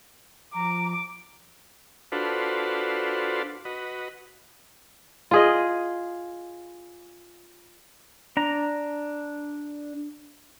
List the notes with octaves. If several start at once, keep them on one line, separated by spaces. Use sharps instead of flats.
F3 A#5 D6
D4 F4 F#4 A4 B4 C5
F#4 B4 D#5
F4 G#4 D#5
D4 A#5